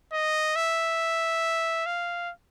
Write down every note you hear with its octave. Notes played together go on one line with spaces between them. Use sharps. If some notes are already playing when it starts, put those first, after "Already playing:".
D#5
E5
F5